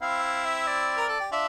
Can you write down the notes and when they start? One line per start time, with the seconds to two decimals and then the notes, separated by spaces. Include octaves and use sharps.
0.01 C4 E4 F5
0.23 F5
0.45 E5
0.67 D5
0.97 A#4
1.08 A4
1.20 G4
1.32 D4 F4 E5